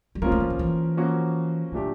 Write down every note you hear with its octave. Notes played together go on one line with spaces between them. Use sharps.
G3
F3 G#3 A#3 C#4 F4 A#4
A3
E3
D#3
E3
F3 A#3 C#4 F#4
A#2 D#3 F#3 A3 D4 G4